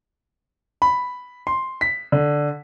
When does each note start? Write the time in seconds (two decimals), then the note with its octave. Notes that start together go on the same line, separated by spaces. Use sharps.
0.82 B5
1.47 C6
1.81 B6
2.12 D3